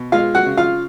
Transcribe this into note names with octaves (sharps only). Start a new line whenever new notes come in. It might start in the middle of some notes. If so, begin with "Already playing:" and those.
Already playing: B2
G#3 F4 F5
F#4 F#5
C#3
F4 F5